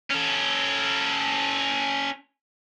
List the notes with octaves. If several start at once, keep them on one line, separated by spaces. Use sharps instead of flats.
C#4 A4